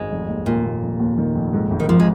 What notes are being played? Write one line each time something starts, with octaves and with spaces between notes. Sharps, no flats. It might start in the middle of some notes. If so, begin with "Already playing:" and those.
Already playing: G#1 G#3
F1
D#2
D#2 A#2
D#2
F1
D#2
D#3
F1
G#2
G#1
D#3
G#1 F3
G#3